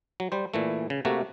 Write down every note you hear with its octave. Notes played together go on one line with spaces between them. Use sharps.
F#3
G3 C5
A#2 E3 A3
C#3
C3 A3 A#3 F#4